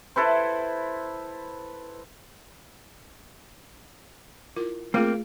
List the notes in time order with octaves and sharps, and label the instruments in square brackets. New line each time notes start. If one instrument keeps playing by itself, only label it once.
[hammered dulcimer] E4 A4 B4 C5
[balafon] E4 F4 A#4
[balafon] A3 F4 G#4 [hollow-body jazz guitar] A#3 C4